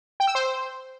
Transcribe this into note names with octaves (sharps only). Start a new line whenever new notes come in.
G5
E6
C5